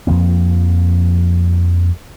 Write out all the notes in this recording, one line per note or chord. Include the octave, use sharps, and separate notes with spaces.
F2 F3 A#3 C4